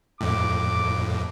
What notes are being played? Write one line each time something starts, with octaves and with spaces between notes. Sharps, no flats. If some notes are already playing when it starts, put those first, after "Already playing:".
F2 A2 D6